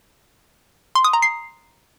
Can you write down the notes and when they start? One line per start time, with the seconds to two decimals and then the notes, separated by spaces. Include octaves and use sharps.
0.95 C6
1.04 D#6
1.13 A#5
1.22 C7